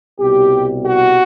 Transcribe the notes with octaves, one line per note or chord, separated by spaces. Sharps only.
C2 B2 G3 G4
F#4